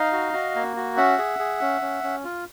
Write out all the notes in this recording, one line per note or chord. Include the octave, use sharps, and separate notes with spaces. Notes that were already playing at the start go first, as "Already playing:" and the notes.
Already playing: D#4 D#5 F5
F#4
F#4
A#3
F#4
C#4 E5 F#5
G#4
G#4
C#4
C#4
C#4
F4